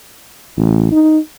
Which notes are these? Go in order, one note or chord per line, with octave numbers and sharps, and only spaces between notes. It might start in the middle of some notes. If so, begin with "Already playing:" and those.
A1
D#4